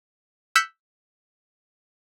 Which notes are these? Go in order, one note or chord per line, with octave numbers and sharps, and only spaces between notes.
E6 F#6 G6 B6 C#7